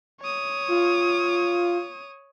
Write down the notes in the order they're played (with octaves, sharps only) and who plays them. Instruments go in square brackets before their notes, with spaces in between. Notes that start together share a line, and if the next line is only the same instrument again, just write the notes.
[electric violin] C#5 D#6
[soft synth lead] F4